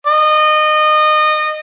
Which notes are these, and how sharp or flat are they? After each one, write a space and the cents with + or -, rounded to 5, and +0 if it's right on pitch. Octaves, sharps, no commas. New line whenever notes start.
D#5 -25